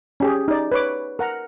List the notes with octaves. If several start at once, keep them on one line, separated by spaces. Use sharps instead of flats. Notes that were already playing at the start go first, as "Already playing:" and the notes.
C#4 G4 G#4
D#4 D5
B4 C#5 D6
A#4 F#5 A#5